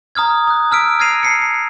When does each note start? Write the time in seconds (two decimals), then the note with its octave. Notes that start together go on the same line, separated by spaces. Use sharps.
0.15 A#5 D#6 F6 G#6
0.48 D#6 F#6
0.71 A5 E6 F6 B6 D7
1.00 F6 G#6 A#6 C7 D#7 F7
1.23 A5 C7 C#7
1.42 C7